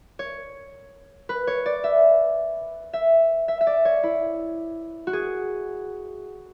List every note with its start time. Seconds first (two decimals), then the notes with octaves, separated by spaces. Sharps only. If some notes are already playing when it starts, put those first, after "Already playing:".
0.19 C#5
1.29 B4
1.47 C#5
1.66 D5
1.84 E5
2.93 E5
3.48 E5
3.61 E5
3.67 D5
3.85 C#5
4.03 E4
5.07 F#4
5.13 G#4